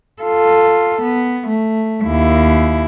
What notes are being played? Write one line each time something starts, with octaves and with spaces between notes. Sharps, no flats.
F4 A4
B3
A3
D#2 E4